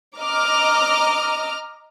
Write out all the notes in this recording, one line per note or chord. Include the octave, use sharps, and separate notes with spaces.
D#5 A#5 D6 F6